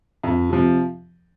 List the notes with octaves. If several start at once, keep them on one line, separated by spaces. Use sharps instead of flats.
F2
C3 F3